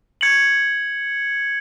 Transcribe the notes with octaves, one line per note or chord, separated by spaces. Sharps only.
G#6 C#7 F#7